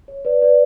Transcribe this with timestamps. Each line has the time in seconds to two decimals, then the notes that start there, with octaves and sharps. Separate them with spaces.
0.08 C#5
0.25 B4 D5
0.42 B4 D5